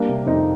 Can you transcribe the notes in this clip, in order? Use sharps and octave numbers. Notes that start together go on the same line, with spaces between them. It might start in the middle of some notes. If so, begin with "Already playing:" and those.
Already playing: G3 A#3 D4
C3
F2 C4 D#4